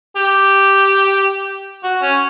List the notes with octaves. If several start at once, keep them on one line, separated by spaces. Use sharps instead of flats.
G4
F#4
C#4